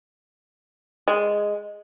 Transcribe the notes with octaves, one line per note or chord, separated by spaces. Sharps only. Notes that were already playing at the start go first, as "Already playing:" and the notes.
G#3